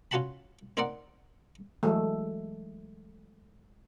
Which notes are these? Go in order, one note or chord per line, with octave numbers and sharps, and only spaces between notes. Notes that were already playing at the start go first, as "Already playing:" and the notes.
C#4 F4 F#4 F#5 A5 B5
C4 D#4 A#4 C5 D5 F#5
E3 F#3 G#3 A3